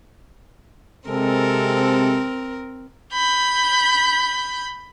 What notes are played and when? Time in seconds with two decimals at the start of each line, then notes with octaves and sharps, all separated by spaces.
1.07 C3 G#3 C4 A4 A#4
3.13 B5 G6